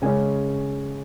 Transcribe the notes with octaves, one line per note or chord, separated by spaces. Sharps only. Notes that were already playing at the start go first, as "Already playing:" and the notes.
C#3 G#3 C#4 G#5